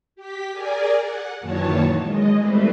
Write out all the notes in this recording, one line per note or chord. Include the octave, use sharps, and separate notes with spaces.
G4 B6
G#4 A#4 D5 G#5
F#5
F#2 A#2 D#3 E3 C#5 A5
G#3 D#5
E3 G3 A3 C4 B4 C5